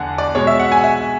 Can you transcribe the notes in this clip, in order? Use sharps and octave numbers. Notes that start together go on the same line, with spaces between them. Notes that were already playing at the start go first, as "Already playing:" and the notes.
Already playing: E2 D3 F#5 G#5 A5
D5
B2 G#3 C#5
E5
F#5
G#5
E5